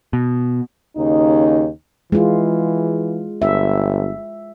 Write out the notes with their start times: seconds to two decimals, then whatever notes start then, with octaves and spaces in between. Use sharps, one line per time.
0.13 B2
0.96 D#2 C#3 D#4
2.12 E3 G#3 F4
3.42 G1 E5